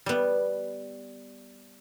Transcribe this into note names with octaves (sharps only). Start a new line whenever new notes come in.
G3 B3